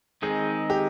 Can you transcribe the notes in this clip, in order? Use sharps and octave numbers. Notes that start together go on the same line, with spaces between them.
D#3 G#3 C4 D#4 G#4
G4